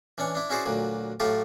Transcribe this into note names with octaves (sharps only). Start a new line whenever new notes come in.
E3 C#4 D4 C#5
D4 E4
C#4 E4 F#4 G#4 C5 D5
D2 A#2 D3 F#3
A2 F#3 A3 F4 G4 A4